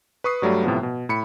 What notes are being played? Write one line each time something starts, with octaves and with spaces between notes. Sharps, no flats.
B4 C#6 D#6 C7
G2 F#3 G3 A3
A2 C3 F3 B3
B2
A2 B5 C#7